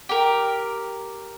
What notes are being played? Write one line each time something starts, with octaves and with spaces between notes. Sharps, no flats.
G4 A#4